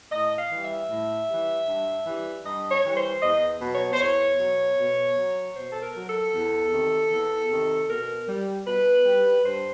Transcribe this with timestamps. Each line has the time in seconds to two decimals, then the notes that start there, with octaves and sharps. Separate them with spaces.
0.11 A2 D#5
0.38 F5
0.51 E3 G3
0.64 E5
0.89 A2
1.29 E3 G3
1.67 G2
2.07 E3 G3
2.45 G2 D#5
2.71 C#5
2.83 E3 G3
2.97 C5
3.22 E2 D#5
3.61 B2 F#3
3.74 C#5
3.93 C5
4.00 E2 C#5
4.39 B2 F#3
4.78 B2
5.17 F#3
5.56 B2 C5
5.71 A4
5.82 A#4
5.95 F#3
6.08 A4
6.33 E2
6.73 C3 D#3
7.11 E2
7.50 C3 D#3
7.89 B2 A#4
8.28 G3
8.66 B2 B4
9.05 G3
9.45 G2 C5